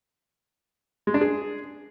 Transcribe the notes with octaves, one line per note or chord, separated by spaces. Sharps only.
G#3
D4
G#4